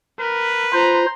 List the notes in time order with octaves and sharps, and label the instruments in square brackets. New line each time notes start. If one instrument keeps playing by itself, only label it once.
[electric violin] A#4 [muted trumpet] B4
[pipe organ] F4 C5 [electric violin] A#5 C6